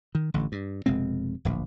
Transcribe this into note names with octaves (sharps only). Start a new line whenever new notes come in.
D#3
A1 D3
G2
F1 B2 G#3 C4
D1 A#1